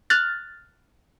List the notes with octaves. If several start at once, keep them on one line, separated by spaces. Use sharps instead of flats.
F6 F#6 A6